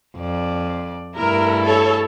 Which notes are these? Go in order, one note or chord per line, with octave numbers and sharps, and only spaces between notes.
F2 D5
G2 A3 E4 A#4
A4 C#5